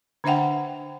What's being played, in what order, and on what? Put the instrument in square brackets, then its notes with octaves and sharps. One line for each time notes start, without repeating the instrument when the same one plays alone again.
[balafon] D3 D4 C5 E5 F#5 G5